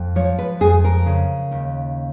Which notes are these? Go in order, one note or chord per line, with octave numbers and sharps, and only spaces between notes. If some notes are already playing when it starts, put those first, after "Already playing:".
Already playing: F2
F3 C#5
B4
F2 G#4
A#4
C#3
D#2